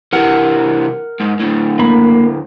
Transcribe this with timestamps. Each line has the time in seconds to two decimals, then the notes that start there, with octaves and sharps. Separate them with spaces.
0.13 C3 E3 A#4 F#5
1.20 G#2
1.40 D2 A2
1.79 A#3 B5